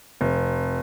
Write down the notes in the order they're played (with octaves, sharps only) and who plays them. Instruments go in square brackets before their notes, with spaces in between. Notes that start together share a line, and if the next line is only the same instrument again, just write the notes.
[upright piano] F1